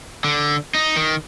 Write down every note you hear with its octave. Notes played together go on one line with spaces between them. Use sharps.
D3
D#4
D#3